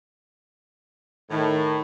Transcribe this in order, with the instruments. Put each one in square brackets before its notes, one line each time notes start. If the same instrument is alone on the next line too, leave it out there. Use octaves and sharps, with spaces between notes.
[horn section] A2 [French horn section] D#3